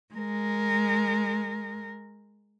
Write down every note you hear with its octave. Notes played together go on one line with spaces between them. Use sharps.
G#3 A#4